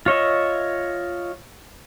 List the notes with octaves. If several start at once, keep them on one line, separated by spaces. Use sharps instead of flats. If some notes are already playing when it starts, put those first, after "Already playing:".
F4 C#5 D#5 E5